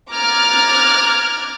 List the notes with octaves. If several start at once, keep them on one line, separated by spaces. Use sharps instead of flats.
A#5 D6 F6 F#6 G#6 A6